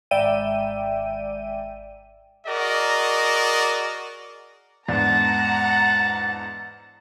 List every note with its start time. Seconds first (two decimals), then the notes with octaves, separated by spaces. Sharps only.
0.11 G#1 D5 E5 G5 D#7
2.46 F#4 G#4 A#4 D5 D#5
4.88 E2 G#2 D4 F#5 A5 A#5